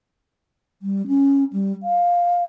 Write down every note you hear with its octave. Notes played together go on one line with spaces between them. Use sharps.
G3
C#4
G3
F5